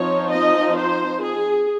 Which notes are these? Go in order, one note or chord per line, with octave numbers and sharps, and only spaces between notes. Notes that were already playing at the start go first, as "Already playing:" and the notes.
Already playing: F3 C4 D#4 C#5
D#5
C5
G#4